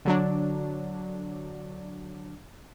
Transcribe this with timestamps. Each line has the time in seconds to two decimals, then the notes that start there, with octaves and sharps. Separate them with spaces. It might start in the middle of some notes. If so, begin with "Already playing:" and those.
0.05 D3 F#3 D4